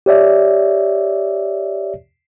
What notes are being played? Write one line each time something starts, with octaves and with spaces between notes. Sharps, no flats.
G4 C#5 D5 E5